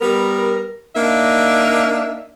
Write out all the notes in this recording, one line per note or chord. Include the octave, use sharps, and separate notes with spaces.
G3 B3 A#4
A#3 D4 D#4 E5